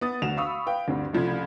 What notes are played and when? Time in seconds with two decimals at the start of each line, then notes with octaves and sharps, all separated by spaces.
0.01 B3 D#6 A6
0.22 D2 F#4 E7 F7
0.37 F5 B5 C#6 D#6 E6
0.66 B4 F5 G5
0.88 D2 G2 C4
1.13 C2 C#3 F3 A3 B5 G#6